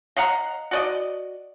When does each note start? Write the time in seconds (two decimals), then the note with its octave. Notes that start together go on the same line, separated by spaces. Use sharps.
0.17 D#5 F5 F#5 A#5
0.71 F#4 D5 D#5